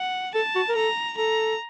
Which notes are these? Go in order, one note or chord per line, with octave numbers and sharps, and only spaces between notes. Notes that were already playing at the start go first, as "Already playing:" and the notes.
Already playing: F#5
A4 A5
F#4
A#4
A4 A#5
A4 A#5